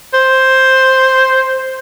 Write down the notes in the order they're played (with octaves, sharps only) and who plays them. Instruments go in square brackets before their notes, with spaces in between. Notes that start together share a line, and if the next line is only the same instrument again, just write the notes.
[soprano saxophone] C5